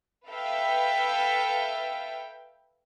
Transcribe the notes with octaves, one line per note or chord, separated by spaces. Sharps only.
A4 B4 E5 F5 G5